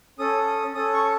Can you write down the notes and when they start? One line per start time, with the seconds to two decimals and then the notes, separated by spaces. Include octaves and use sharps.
0.19 C#4 A4 D#6
0.47 D#6
0.74 C#4 A4 D#6
0.94 C#6